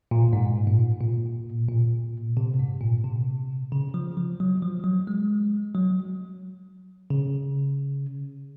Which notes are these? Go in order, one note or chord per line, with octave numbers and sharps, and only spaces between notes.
A#2
G#2
A#2
A#2
A#2
C3
G#2
A#2
C3
C#3
F3
F3
F#3
F3
F#3
G#3
F#3
C#3